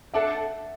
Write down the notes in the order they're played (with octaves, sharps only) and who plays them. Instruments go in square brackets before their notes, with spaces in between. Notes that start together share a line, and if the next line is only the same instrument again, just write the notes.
[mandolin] D4 A4 F#5 A5 [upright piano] E5